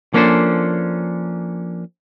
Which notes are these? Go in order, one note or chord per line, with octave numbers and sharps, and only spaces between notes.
F3 A#3 C#4 D4 A4 C5